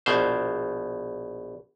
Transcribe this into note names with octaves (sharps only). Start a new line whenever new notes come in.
A#1 B2 C5